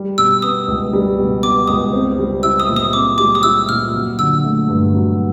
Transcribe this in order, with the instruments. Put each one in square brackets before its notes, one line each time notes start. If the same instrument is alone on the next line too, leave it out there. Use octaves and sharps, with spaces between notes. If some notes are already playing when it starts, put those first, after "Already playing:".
Already playing: [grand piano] G3
[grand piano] B2 [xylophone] E6
[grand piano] B3 [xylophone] D#6
[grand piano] C#2
G3
B2
[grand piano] B3 [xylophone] D6
[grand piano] C#2 [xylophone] D#6
[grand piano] C4
G3
[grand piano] E4 [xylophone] E6
[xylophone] D#6
[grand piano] A#2
[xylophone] D#6
[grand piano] C4 [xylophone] D6
[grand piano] G3 [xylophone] D6
[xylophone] D#6
[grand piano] E4 [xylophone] E6
[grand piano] A#2 [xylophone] F6
[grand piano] F#3
[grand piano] D3 [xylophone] E6
[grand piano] A3
G2
F#3